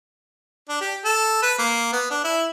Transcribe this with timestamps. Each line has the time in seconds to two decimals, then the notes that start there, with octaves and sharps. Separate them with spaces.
0.69 D4
0.81 G4
1.05 A4
1.42 B4
1.58 A#3
1.92 B3
2.10 D4
2.24 E4